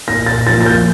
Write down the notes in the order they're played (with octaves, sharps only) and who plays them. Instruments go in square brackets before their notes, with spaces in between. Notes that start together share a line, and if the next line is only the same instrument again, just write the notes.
[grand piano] A#2 A#6
A6
F3 A6
A#3
A6
G6